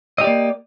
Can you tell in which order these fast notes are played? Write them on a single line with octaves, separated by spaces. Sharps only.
D#5 G4 D5 A#3